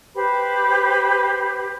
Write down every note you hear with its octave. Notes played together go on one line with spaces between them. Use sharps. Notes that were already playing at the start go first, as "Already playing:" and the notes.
G4 B4 C5 B5